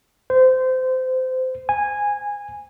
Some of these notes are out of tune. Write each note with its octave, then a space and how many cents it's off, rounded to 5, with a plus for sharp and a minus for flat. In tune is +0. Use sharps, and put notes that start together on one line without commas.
C5 -25
G#5 -10